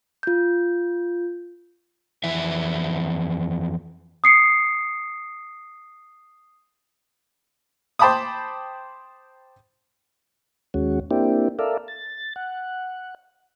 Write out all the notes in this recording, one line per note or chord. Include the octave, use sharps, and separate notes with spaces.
F4 G6
F2 E3 E5
D#6 C7 C#7
C5 G5 A5 B5 D6 D#6
D#2 G#3 C#4 F#4
A#3 C4 D4 E4 G4
A4 A#4 D5 E5 F5
A6
F#5